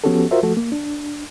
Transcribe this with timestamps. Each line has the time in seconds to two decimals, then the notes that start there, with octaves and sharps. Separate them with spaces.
0.04 F3 B3 C#4 F#4 G4 A4
0.31 F4 F#4 A#4 C5 E5
0.43 F3 A3 F#4 A4
0.57 A#3
0.72 D4